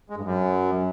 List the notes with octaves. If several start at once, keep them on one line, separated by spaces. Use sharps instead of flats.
G#3
G2
F#2